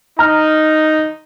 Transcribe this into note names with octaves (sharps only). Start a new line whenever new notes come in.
D#4 A#5 F6